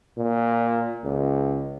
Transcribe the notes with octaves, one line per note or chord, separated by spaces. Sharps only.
A#2
C#2